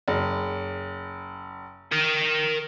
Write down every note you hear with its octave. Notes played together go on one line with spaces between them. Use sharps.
F#1
A#4 G5